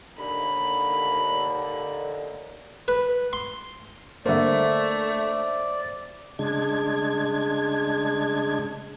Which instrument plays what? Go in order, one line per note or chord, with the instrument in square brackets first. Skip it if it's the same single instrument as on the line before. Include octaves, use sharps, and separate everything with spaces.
[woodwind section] D#2 D3 [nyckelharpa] B5
[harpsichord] B4
C6
[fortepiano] D3 A#3 [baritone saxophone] A3 [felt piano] C5 E5 [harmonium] D5
[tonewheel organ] C#3 G#3 D4 G#6